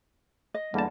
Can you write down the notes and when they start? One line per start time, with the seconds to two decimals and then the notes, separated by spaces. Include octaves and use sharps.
0.54 D#5
0.74 E2 D3 G3 A#3 A5